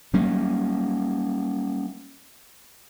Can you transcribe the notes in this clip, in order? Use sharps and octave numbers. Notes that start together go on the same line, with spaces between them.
F#3 G3 A#3 C#4